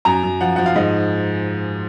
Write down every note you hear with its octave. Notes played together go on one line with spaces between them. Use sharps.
F#2 A#5
F#2
F3 F#5
F3 F#5
F5
G#2 D#5